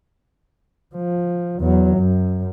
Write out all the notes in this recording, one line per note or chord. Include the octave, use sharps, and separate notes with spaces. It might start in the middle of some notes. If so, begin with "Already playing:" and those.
F3
E2 F#3
F#2